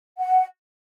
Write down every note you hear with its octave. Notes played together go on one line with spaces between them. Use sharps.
F#5